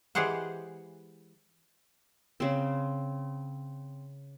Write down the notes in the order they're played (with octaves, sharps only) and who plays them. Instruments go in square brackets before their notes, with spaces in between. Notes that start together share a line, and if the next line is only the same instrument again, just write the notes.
[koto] E3 G#3 G4 G#4 C5 F#5
[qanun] C#3 C4